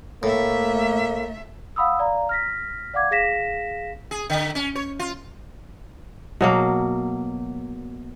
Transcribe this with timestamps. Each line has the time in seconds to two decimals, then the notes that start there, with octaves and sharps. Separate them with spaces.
0.23 A2 A3 A#3 E5
1.76 F5 F#5 B5 D#6 E6
1.99 D5 F5 A#5
2.29 F6 A#6 B6
2.94 D5 F5 F#5 D6 G#6
3.11 G#4 F5 A#6 B6 E7
4.11 G#4
4.30 D3
4.55 C#4
4.75 C#5
4.99 F4
6.41 B2 F#3 A#3